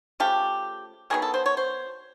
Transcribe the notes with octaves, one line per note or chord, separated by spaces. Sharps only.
C#3 F3 A3 G4
D#3 F#3 B3 G#4
A4
C5
C#5
C5